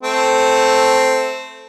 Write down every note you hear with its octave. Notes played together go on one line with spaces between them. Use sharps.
A3 C4